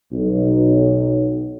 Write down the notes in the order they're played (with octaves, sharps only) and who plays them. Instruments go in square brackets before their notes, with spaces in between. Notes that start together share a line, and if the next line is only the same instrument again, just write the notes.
[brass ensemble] B1